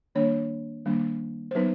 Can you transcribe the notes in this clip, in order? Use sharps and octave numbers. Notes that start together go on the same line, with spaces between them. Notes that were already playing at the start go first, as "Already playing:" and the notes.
D#3 G3 A#3 D4 C#5
D#3 G3 A#3 D4
C5
F#3 B3 D#4 B4